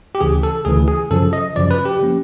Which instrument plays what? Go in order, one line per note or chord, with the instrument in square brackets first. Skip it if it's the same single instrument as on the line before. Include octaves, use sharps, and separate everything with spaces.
[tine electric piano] G4
D2 C#3 E3 G#4
A4
D2 C#3 E3 G#4
G#4
F#2 C#3 F3 A4
D#5
F#2 C#3 F3 D5
B4
G4
F3 A#3 C#4